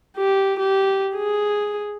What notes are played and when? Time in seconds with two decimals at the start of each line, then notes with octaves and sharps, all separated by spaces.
0.17 G4
0.59 G4
1.16 G#4